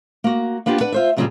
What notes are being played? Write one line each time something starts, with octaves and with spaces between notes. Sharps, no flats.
A#3 F#4
A#3 B3 D4 F4 G4
D4 B4 D5 F#5
F4 C5 E5
F2 A#2 C#3 F#3 G3 F4